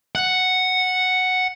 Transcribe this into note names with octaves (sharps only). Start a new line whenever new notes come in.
F#5